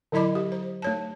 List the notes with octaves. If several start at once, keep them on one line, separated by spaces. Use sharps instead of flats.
D3 F#3 E4 D#5 B5 D6
G4
C5
A3 C#5 A5